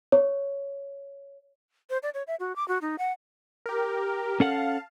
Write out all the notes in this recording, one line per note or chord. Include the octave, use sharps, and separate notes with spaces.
C#5
C5
D5
C#5
E5
F#4
D6
F#4
D#4
F#5
G4 A#4
C#4 A4 F5 F#5 A5